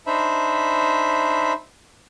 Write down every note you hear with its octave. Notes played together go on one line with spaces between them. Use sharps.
D4 D#4 C5 E5 B5